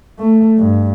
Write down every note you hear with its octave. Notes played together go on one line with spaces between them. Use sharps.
A3
G2